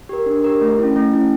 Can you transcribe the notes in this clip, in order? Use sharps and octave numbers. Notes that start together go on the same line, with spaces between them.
G4 A#4
D4
G4 A#4
A3
C#4 E4
A3
C#4 E4